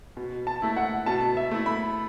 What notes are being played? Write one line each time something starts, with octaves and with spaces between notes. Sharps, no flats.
B2
A5
A3 E4
F#5
B2 A5
E5
A3 E4
B5